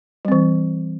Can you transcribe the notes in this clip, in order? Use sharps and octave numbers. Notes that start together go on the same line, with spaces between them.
E3 G3 C4